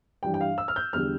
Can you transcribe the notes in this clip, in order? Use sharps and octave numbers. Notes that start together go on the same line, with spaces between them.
G2 E3 G3 D4 G5
G5
F5
E6
F6
G6
E2 D3 G3 F6